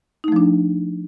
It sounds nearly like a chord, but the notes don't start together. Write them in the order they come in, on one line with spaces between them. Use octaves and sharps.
D#4 A3 F3 D4